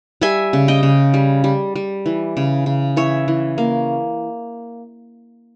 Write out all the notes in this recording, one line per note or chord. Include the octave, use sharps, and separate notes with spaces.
G3 E5 G#5
C#3
D#5 G5
C#3
G3
G3
G3
E3
C#3
C#3
E3 C#5 E5
E3
A#3